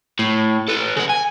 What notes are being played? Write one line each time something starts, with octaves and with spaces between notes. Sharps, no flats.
A2
A4 B4
C#3 F#5
G#5